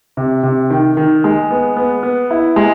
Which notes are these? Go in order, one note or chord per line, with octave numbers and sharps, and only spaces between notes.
C3
C3
D#3
D#3
G#3
B3
B3
B3
E4
G#3